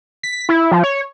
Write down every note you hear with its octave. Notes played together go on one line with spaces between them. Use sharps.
B6
E4
F3
C#5